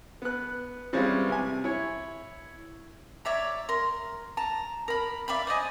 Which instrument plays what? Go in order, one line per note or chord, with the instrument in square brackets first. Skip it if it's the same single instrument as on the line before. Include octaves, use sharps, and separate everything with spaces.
[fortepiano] B3 F#6
E3 G3 G#3 C4 C#4 F4
C3 G#5
E4 C#5
[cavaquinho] C#5 D5 E5 A#5
A#4 C6
A5 A#5
A#4 B5
D5 E5 F5 B5
C5 D5 D#5 G#5